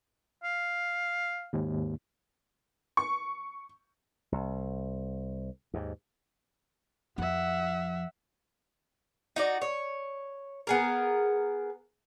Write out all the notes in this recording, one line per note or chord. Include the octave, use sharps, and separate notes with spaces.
F5
D#2 G#2
C#6
C2
D#2 G#2
F2 F3 E5 F#5
D#4 F#4 D5
C#5
B3 G#4 A#4